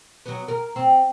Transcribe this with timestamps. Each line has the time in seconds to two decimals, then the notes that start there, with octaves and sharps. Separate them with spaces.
0.25 F#3 B3
0.48 A#4
0.76 C4